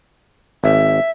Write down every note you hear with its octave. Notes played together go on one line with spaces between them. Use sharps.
G#1 E5